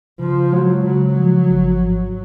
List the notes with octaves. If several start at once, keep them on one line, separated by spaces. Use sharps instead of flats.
C#3 F3
F#3 G#3
C#3 F#3
F3
G#1
G#2